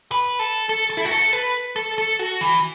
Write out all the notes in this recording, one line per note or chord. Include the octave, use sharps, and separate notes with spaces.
B4
A4
A4
A4
E4
F#4
A4
B4
A4
A4
F#4
E3